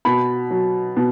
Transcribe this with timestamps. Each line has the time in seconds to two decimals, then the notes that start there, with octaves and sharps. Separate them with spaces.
0.05 B2 B5
0.51 F#3
0.97 B2